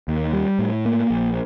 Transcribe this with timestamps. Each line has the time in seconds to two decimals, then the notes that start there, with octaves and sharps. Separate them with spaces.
0.08 D#2
0.33 G3
0.59 A2
0.85 A#3
1.10 A#1